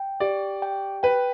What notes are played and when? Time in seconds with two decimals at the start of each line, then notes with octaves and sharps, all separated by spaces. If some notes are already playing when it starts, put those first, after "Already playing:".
Already playing: G5
0.20 G4 D5
0.62 G5
1.03 B4 G5